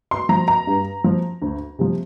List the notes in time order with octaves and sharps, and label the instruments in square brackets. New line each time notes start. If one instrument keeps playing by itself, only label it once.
[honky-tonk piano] C6
F3 A#5
A#5
G2
F3
D2
C3 F3